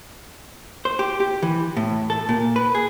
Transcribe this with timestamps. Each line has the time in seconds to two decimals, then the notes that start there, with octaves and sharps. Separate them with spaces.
0.85 C5
0.99 G4
1.20 G4
1.43 E3
1.77 A2
2.10 A4
2.29 A#2
2.56 B4
2.75 G#4